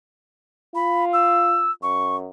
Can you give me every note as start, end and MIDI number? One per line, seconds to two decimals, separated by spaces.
0.75 1.70 65
0.75 1.05 83
1.13 1.71 88
1.83 2.29 42
1.83 2.16 85